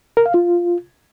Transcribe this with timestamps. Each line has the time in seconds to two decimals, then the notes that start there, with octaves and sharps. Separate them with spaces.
0.17 A#4
0.26 F5
0.34 F4